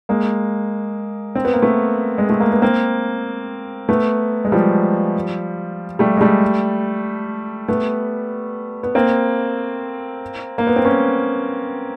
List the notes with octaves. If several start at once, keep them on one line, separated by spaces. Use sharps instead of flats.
G#3 A#3
C4
B3
A#3
A3 B3
G#3
A3
A#3
B3
A#3 C4
A3 B3
G#3
F3 G3
G3 A3
G#3
G3 A3
A3 B3
B3
A#3 C4
A#3
B3
C4
B3 C#4